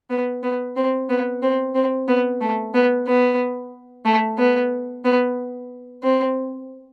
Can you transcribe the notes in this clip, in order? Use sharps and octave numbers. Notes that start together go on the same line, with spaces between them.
B3
B3
C4
B3
C4
C4
B3
A3
B3
B3
A3
B3
B3
C4